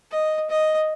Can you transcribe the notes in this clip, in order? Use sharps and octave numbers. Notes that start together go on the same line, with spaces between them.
D#5
D#5